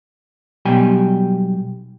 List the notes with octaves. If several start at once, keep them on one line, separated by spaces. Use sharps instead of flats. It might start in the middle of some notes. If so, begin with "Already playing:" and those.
B1 B2 G3 G4 G#5